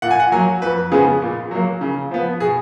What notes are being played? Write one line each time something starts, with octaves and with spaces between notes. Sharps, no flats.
A#2 F#5
G#5
F#5
F#3 A#3 G#5
F2 B4
C#3 F3 G#3 B3 G#4
A#2
F#3 A#3
C#3
F3 B3
B2 G#4